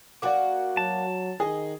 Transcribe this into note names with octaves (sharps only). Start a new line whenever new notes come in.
A#3 F#4 D5 F#5 D6
F#3 A5
D#3 G#4 D#5